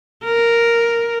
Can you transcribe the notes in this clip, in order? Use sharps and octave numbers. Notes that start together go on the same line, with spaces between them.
A#4